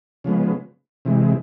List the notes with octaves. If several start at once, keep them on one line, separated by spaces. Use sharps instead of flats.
C#3 F3 G#3 B3
C3 E3 G#3